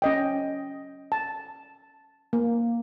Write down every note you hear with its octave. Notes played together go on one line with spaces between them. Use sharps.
C#4 D#5 G5
A5
A#3